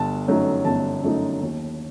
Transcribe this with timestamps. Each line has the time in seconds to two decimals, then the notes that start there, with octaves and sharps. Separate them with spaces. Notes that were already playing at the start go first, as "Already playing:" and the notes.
Already playing: G1 A5
0.28 F#2 F#3 A3 D#4
0.65 G1 A5
1.03 F#2 F#3 A3 D#4
1.42 D#2